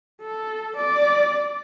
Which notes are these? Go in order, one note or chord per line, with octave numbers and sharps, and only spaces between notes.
A4
D5